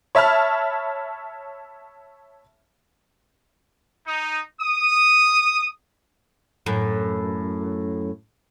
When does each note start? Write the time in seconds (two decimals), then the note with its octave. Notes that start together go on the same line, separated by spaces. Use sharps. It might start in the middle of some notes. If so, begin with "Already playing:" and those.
0.15 C#5 E5 A5 B5 F6
4.07 D#4
4.61 D#6
6.66 F#2 A2